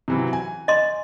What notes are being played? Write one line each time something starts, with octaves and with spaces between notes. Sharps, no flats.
C3 E3 F#3
G#5
D#5 C6